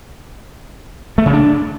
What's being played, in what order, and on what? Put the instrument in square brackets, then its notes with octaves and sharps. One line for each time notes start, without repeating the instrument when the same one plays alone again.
[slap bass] A3
C#3
D4